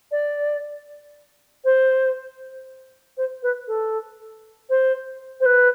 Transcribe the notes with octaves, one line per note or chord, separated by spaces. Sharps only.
D5
C5
C5
B4
A4
C5
C5
B4